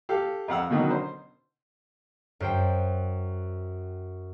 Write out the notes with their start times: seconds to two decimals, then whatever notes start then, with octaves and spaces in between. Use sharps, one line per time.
0.09 G4 A4 F5
0.48 F2 F5 F#5 E6
0.70 B2 D3 D#3 F#3 C#4
0.90 C5
2.40 F#2 C5 G5